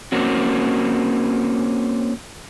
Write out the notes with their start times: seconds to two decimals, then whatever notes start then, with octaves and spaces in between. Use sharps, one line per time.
0.12 A#3 C4 C#4 F#4